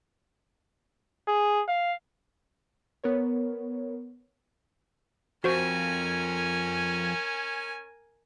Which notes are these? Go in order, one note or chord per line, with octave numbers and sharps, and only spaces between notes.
G#4
F5
B3 A#4 C#5
F2 C#4 F#4 A#4 C5 G#5 C#6